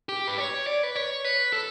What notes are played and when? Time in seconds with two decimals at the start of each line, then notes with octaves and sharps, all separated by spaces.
0.09 G4
0.27 B4
0.38 C#5
0.67 D5
0.83 B4
0.95 C#5
1.24 B4
1.53 A4